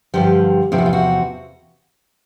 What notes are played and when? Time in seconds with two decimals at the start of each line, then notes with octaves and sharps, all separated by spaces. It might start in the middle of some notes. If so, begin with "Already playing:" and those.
0.14 G2 D3 F3 G4
0.72 E2 C3 F3 G4
0.78 F#4
0.86 F4
0.93 F#4